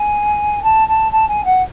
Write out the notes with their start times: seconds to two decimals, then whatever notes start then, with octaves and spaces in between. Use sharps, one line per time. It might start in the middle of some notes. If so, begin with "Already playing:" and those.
Already playing: G#5
0.63 A5
0.88 A5
1.11 A5
1.28 G#5
1.45 F#5